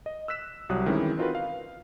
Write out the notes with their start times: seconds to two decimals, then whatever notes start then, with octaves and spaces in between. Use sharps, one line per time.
0.06 D#5
0.28 E6 F#6 B6 E7
0.69 C2 F#3 G3 D#6 F#6
0.86 D#3 E3 G#3 C4 C#4 E4
1.18 C4 D#4 F4 F#4 A#4 B4
1.35 F5